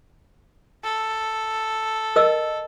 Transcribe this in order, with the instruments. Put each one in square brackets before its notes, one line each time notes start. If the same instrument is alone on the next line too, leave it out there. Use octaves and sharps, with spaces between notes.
[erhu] A4
[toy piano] A#4 D#5 E6